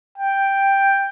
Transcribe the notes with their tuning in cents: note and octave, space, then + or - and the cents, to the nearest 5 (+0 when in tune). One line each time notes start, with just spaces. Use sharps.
G5 +5